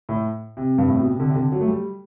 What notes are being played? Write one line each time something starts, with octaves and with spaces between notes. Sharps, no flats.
A2
C3
G2
A2
B2
C3
D3
C3
D3
F#3
A3
G3